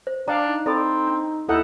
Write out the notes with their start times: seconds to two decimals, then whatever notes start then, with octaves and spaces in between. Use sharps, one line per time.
0.07 C5
0.28 D4 D5 F5 G5 A#5
0.48 D#4
0.66 C4 E4 A4 D5 B5
1.07 D4
1.49 D#2 D#4 E4 A4 F#5